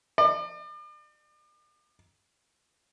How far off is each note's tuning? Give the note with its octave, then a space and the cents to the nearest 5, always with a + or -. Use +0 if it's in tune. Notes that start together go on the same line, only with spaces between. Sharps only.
D5 +40